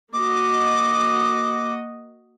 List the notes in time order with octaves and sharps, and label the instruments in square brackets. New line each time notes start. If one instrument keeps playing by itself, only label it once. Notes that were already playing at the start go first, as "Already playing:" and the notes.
[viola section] A#3 F#4 D#5 [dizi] D6